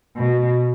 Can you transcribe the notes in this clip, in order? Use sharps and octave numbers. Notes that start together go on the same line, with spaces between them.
B2